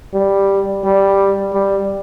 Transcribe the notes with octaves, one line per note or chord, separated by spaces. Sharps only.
G3
G3
G3